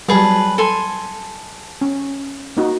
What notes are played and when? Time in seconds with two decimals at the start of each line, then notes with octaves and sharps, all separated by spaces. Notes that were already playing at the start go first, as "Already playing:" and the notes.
0.08 F#3 G3 G#4 B4 A5
0.58 A4 G#5 C6
1.81 C#4
2.57 A#3 D#4 F#4